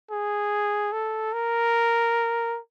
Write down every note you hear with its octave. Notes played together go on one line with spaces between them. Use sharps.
G#4
A4
A#4